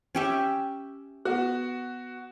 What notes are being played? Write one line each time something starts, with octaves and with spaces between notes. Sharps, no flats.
C#4 G4 E5
B3 F#4